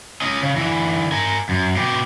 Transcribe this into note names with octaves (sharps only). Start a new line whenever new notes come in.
C#4 D#5
C#3
D3 E3
A#4 G#5
F#2
B2 G4